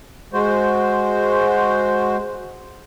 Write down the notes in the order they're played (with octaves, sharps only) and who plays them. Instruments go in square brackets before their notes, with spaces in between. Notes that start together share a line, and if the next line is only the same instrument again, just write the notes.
[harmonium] G#3 F#4 C5